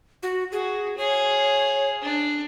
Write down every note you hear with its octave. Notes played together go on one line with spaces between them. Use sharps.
F#4
F#4 G#4
G#4 C#5 F5
D4